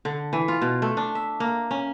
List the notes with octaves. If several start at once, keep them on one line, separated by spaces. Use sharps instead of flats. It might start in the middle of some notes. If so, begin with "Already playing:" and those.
D3
E3
F4
B2
A3
D4
E5
A#3
C#4